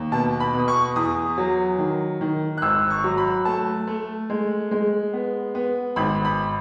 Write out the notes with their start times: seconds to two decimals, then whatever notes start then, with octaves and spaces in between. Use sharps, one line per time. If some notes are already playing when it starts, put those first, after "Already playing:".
Already playing: D#2
0.12 B2 A5
0.40 B5
0.54 B2
0.59 D#6
0.68 C#6
0.96 E2 D#6
1.38 F#3
1.79 D#3
2.21 D#3
2.58 F#6
2.62 G#1 E6
2.90 C#6
3.04 F#3
3.17 B5
3.45 A3 A5
3.87 A3
4.30 G#3
4.71 G#3
5.13 B3
5.55 B3
5.96 G#1 B5
6.25 B5